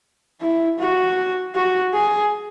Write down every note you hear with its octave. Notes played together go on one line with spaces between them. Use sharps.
E4
F#4
F#4
G#4